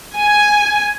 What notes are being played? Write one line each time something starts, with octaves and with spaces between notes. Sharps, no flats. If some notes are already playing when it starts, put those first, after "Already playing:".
G#5